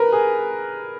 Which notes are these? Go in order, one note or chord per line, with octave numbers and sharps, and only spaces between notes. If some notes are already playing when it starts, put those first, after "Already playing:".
Already playing: A#4 B4
G#4